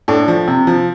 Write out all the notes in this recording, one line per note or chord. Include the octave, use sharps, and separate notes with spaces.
A2 D4
F3
C3
F3